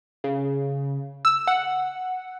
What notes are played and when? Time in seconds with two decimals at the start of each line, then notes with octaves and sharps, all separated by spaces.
0.24 C#3
1.25 E6
1.47 F#5